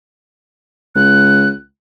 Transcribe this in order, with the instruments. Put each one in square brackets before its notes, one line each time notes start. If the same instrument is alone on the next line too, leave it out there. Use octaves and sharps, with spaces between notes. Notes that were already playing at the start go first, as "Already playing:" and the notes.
[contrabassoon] C#2 [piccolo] F#6